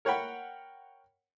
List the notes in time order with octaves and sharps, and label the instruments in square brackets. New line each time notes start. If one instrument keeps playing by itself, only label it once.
[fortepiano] A#4 C#5 F#5 G5 B5